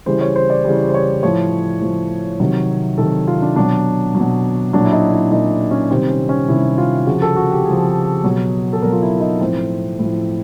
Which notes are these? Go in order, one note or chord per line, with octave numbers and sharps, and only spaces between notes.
C#3 E3 G3 C5
C#5
C5
D5
C#3 E3 G3
C5
C#5
A2 F3 C#5
A2 F3
C3 D#3 F#3
C3 D#3 F#3 A4
F4
D4
B2 F#3 D4
F#3
B2
A#2 F#3 D4
E4
D#4
E4
A#2 F#3 D#4
C#4
C3 D#3 G3 C4
C#4
C#4
C3 D#3 G3 E4
F4
C#3 F3 F#4
A4
F#4
G4
C#3 F3 G#4
B2 F#3
A4
B2 F#3 A#4
F4
E4
D#4
A2 F3 C4
A2 F3